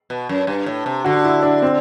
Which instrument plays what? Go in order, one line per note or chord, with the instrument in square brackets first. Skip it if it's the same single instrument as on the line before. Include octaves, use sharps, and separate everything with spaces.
[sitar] B2
F#2
G2
A2
C3
[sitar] D3 [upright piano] F#4
[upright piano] E4
D4
C4